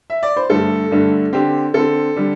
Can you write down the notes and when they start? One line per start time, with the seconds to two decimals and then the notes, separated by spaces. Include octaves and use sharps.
0.10 E5
0.23 D5
0.36 C5
0.50 G2 D3 A3 A4
0.91 G2 D3 A3
1.33 D3 C4 G4
1.74 D3 C4 A4
2.16 D3 G3